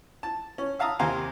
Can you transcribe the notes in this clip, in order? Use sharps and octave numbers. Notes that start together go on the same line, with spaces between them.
A5
C#4
E5 F5 A5 A#5 D#6
D#2 C3 C5 F5 G#5 A#5